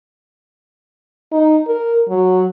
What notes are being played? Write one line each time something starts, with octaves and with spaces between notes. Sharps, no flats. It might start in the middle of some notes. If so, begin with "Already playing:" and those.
D#4
A#4
F#3